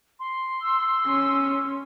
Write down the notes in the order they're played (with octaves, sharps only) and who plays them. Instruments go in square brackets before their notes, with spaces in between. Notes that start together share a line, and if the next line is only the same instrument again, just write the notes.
[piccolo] C6
[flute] E6
[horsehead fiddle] C#4